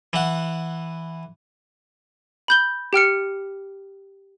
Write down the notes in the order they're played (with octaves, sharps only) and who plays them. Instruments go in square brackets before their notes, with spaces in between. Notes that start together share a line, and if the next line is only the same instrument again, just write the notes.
[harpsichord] E3 F#5
[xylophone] B5 G6 G7
G4 G5 F6 C#7